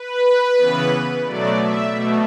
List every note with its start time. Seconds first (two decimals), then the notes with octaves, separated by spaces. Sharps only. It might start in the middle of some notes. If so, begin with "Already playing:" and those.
Already playing: B4
0.58 C#3 E3 B3
1.25 B2 F#3 A3 D5
1.60 E5
1.93 B2 A3